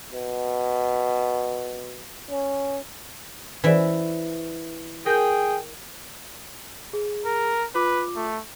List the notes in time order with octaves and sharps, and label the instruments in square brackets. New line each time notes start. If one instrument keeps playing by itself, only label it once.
[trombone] B2
C#4
[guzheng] E3 E5 [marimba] B4 C5 D5
[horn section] G#4 G5 [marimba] A#4 G6
[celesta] G#4
[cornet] A#4
[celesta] F4 D6 [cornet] B4
[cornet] A3